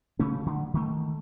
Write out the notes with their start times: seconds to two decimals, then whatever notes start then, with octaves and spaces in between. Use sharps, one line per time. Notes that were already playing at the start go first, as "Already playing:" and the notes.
0.19 C#3 A3 C#4
0.46 D3
0.74 D#3 A3